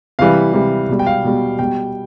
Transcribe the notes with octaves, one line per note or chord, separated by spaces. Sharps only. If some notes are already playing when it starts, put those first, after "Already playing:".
C3 E3 G3 F5
C3 E3 G3
B2 G3
G5
F5
B2 G3
B2 G3 G5